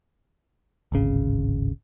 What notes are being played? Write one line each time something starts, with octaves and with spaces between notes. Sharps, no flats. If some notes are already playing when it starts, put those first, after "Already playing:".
D1 G#1 C#3